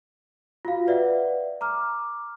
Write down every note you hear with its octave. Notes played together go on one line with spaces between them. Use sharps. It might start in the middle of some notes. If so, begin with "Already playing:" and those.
F4 F#4 F5
B4 D5 E5 F#5
A#5 D6 F6